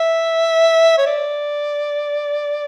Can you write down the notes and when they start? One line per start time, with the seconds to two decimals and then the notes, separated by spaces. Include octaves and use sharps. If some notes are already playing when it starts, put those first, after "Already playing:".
Already playing: E5
0.98 C#5
1.07 D5